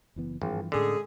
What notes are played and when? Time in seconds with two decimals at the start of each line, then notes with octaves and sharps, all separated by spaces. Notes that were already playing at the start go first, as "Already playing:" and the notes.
0.16 F#1 E3 B3
0.42 G#1 G2 E3 F3
0.72 A2 D3 G#3 C#4 G#4